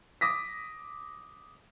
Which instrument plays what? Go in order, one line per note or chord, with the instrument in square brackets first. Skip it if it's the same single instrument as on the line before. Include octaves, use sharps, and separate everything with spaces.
[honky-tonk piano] D6 D#6 A#6 B6